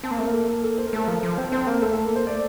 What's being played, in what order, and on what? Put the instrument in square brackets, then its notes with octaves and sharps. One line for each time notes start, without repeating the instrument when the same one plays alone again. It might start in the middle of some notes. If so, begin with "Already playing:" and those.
[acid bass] C4 [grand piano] A5
[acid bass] A#3
[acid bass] A3 [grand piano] A#4
[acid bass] A#3
[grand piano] A4
A4
A4
C5
A#4
[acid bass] A3 [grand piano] A4
[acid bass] F3 [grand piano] A#4
[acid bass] F3
[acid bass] C4 [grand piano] C5
[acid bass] C4 [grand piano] C5
[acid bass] A#3 [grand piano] A#4
[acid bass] A3 [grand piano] A4
[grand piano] A4
[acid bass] A#3
[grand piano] C5
[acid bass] A3 [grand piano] D5